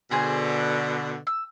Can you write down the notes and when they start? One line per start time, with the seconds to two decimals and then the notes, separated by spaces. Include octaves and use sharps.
0.11 B2 D3 G#4 C5 G#5
1.27 E6